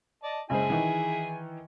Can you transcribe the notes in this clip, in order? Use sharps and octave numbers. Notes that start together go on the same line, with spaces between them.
D5 D#5 A5
F#1 G#3 E4 G#4 C5 G#5
D#3 E3